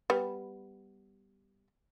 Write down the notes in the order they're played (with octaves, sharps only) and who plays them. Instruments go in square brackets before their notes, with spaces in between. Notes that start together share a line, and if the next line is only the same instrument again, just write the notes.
[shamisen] G3 B3